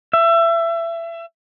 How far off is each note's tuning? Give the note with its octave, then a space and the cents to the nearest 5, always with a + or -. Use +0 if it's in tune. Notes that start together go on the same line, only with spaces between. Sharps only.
E5 +25